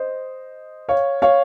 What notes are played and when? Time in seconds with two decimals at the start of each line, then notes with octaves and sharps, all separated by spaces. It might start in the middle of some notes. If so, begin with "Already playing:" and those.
Already playing: C5 D#5
0.89 C#5 F5
1.22 C#5 F5